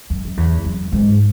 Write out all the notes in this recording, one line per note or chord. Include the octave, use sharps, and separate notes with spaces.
F#2
F#2
E2
F#2
G#2